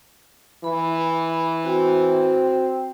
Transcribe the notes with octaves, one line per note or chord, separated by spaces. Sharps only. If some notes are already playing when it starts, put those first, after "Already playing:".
E3 B5
C4 F#4